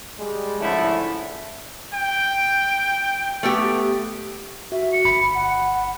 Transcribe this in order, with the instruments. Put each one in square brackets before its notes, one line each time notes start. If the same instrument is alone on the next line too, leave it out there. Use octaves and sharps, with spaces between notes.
[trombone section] G3 G#3
G#1 D3 F3 A3 C#4 E4
[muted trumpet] G5
[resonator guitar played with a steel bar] A3 B3 G4
[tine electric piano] F#4 [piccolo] E5
[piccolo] C#7
[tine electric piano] G1 B5
[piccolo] F#5